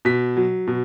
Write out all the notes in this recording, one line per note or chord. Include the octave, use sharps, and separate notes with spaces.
B2 B6
F#3
B2